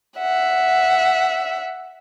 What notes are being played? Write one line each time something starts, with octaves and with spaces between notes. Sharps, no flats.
E5 F#5